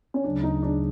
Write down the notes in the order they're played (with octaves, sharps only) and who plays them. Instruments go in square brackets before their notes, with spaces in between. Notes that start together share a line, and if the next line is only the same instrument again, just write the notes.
[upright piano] C#4
[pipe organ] D2 C#3 F#3 [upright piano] D4
[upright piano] D#4
D4